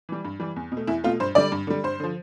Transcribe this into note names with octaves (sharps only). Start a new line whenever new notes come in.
E3 G3
G2
E3 G3
E2
B2
A3
E2 E4
B2 A3 F4
G2 C5
D3 G3 D5
G2
D3 G3
G2 C5
D3 F3